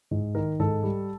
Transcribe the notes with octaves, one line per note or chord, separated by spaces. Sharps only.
G#2
D#3 A#4
G#2 A4
G3